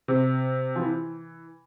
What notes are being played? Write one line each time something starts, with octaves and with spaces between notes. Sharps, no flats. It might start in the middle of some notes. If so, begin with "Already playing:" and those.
C3
F3
E3